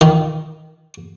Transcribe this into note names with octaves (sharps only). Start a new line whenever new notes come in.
D#3